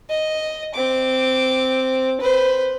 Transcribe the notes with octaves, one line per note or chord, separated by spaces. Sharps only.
D#5
C4 D6
B4 C5